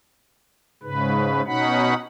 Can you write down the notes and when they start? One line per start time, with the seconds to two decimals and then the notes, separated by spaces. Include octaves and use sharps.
0.83 G#2 C#3 B4
1.46 B2 C#4 D#4 F#5 B5